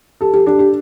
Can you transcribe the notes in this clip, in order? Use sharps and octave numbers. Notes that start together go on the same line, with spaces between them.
G4 A4
G4
D4 G4
G4